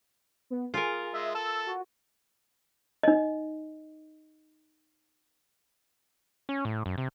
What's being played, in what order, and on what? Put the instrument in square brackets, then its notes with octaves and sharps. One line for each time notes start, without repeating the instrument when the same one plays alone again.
[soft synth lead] B3
[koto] F4 A#4 [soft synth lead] G#4
[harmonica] G#3 [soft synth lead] E5
[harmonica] A4 [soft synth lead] E6
[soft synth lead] F#4
[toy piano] D#4 D#5
[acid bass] C#4
A2
F#2
C3